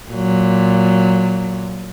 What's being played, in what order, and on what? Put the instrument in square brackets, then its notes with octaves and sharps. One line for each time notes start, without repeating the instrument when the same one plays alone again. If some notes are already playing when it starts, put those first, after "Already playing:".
[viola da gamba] A#2 F#3